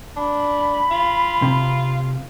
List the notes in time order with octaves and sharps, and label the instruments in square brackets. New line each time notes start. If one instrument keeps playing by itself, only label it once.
[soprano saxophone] D4 [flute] B5
[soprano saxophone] F4
[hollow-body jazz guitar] C3